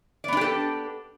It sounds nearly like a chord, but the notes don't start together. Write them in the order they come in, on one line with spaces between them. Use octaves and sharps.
D5 B3 D4 G4 A4